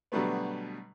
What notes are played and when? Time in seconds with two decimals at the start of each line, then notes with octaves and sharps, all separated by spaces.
0.12 B2 D3 F#3 G3 A3 B3